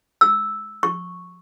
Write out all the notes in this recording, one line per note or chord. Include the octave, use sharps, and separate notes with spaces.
E6
C#6